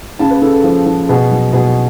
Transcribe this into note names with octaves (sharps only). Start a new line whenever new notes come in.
C#3 A5
B4
C#3 A4
A4
F3
F3
B2 G#4
F#3
B2 G#4